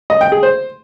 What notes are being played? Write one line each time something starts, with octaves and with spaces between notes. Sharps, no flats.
D#5
G5
G#4
C5